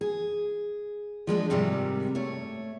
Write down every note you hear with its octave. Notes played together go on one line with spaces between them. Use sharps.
G#4
F3 G#3 C#4 D4
G#2 C3 D#3 G3
A3 C#5